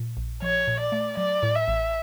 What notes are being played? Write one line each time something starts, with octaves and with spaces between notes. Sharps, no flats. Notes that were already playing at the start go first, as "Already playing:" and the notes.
Already playing: A#2
A#1
F3 C#5
A#2
D5
A3
F#3 D5
A2
E5
A1